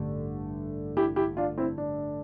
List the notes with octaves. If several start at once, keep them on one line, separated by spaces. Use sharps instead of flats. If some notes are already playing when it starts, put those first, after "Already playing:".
Already playing: A1 G2 D3 A3
E4 G4
E4 G4
D4 F4
C4 E4
D4